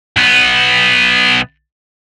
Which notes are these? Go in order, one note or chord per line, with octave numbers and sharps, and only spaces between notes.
B1 B3